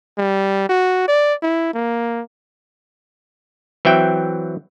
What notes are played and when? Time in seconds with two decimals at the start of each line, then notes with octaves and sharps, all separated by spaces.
0.18 G3
0.69 F#4
1.08 D5
1.42 E4
1.73 A#3
3.85 E3 F#3 C4 E5 G5